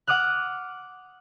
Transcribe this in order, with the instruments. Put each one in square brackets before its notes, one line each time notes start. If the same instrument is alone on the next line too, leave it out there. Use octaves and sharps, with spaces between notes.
[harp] F#5 D6 D#6 F6 F#6